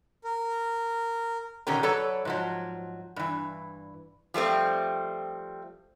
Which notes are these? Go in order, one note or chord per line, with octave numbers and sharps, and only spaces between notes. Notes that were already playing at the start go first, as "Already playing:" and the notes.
A#4
B2 D3 D#3 C#4 G4 A#4
F#3 A4 B4 C#5 D5
G#2 F3 F#3
G2 E3
F3 G3 A3 C4